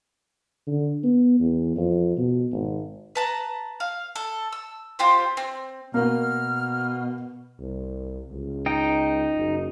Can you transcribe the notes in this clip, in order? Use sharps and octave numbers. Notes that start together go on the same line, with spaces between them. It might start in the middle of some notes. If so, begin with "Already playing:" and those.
D3
B3
E2
F2
B2
G#1
B4 A5 A#5
F5
A4
E6
C4 F4 G4 C5
C4
B2 A#3 F6
C2
C#2
D#4 G5
F#1